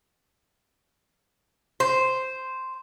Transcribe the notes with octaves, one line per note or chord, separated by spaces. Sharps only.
C5